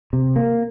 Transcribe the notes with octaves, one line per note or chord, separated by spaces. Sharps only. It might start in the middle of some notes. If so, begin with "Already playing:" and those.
C3
A#3